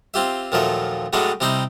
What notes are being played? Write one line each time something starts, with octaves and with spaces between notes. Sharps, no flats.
C4 F4 G4 E5
D#2 A#2 F3 F#3 A3 E5
A2 F#3 G#3 A3 C#4 D4
C3 G3 D#4 E4 G5 C6